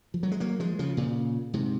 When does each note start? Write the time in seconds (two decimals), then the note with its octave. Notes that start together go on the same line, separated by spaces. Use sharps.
0.14 F3
0.23 F#3
0.31 G#3
0.40 F#3 A#3
0.60 F3 G#3
0.79 C#3 F3
0.97 A#2 C#3
1.53 G#2 C3